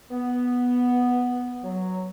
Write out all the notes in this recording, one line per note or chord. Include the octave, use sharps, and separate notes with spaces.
B3
F#3